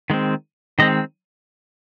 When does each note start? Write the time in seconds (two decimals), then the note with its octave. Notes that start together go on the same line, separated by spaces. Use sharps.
0.10 D#3 G#3 C4
0.79 D#3 G#3 C4 D#5